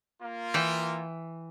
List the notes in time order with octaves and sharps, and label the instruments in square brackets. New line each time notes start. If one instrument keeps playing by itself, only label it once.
[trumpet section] A#3 F4
[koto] E3 G5